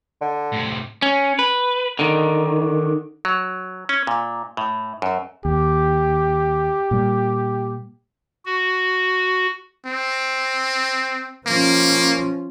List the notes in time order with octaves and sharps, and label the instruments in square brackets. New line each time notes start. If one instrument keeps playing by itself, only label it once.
[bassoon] D3
[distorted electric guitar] A2 C3
[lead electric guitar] C#4
B4
D3 D#3
[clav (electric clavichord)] F#3
C#4
A#2
A2
F#2
[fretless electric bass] D#2 [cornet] G4
[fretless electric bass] A#2 G3
[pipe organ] F#4
[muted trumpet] C4
[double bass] F3 C#4 [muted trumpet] A#3